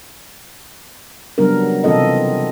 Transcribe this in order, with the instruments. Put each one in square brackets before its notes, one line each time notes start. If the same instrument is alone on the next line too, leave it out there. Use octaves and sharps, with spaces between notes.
[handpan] C#3 F#3 G3 B3 D4 A#4
C3 E3 C4 F4 A4 D#5